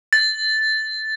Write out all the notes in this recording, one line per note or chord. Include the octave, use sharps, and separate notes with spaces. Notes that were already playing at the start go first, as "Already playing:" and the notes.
A6